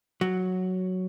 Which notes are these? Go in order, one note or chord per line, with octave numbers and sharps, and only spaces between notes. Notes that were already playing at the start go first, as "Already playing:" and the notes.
F#3